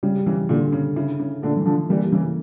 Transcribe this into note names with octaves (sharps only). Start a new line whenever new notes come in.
C#3 G3
C#3 E3
A#2 D3
C#3
C#3 E4
C#3
A#2 D3 A3
E3
D3 F3
E3 G3 A#3
C#3 E3